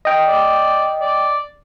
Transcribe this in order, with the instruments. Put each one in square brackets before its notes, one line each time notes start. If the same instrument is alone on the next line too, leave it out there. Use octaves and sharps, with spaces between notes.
[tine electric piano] D#5 G5
[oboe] D5
D5